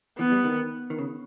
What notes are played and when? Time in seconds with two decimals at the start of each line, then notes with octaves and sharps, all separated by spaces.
0.18 E3 B3
0.32 G3
0.45 D#3
0.90 D#3
0.99 C#3